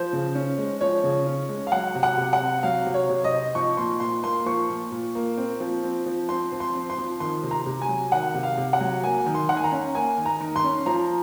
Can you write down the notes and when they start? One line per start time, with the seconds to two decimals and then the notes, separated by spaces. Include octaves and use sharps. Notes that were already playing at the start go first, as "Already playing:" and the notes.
Already playing: F3 C5
0.13 C#3
0.35 C#4
0.58 G#3
0.81 F3 C#5
1.04 C#3
1.26 C#4
1.49 G#3
1.67 F5
1.72 F#3 F#5
1.95 C3
2.03 F#5
2.17 C3
2.33 F#5
2.40 C4
2.63 F#3 F5
2.87 C3
2.94 C#5
3.10 C3
3.24 D#5
3.32 C4
3.55 F3 C#6
3.77 A#2 C6
4.00 A#2 C6
4.23 A#3 C6
4.46 F3 C#6
4.70 A#2
4.92 A#2
5.15 A#3
5.37 C4
5.60 F3
5.83 C4
6.06 F3
6.29 C4 C6
6.52 F3
6.60 C6
6.75 C4
6.90 C6
6.98 F3
7.20 D#3 C6
7.43 C3
7.51 A#5
7.66 C3
7.82 G#5
7.89 F#3
8.12 D#3 F#5
8.35 C3
8.43 F5
8.58 C3
8.73 F#5
8.81 F#3
9.04 A#3 G#5
9.26 D#3
9.35 C6
9.49 D#3 F#5
9.57 G#5
9.64 A#5
9.72 C#4
9.95 A#3 G#5
10.18 D#3
10.26 A#5
10.40 D#3
10.56 C6
10.64 C#4
10.86 F3 A#5